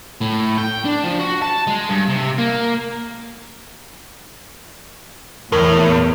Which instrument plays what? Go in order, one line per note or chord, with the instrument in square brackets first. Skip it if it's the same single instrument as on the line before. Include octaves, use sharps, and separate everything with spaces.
[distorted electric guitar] A2
G5
D4
F3
F#4
A5
G#3
G2
C3
A#3
[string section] E2 [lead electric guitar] A2 [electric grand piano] A#4